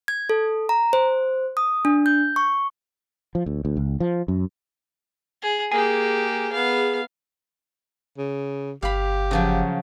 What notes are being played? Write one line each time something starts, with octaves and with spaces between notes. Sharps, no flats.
G#6
A4
A#5
C5
D#6
D4
G6
C#6
F3
D2
D2
C#2
F3
F#2
G#4
A#3 G4 G#4
B3 F5
C#3
G1 G4 F5 B5
C#3 F3 F#3